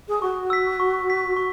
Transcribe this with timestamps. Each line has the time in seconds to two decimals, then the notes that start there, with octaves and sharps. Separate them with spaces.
0.08 G#4
0.22 F#4 C#6
0.50 E6 B6
0.80 C#6
1.08 E6 B6
1.36 F#4 C#6